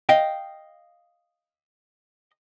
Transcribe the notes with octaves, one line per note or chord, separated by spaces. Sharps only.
D#5 F5 G5